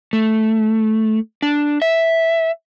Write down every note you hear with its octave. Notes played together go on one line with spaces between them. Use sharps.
A3
D4
E5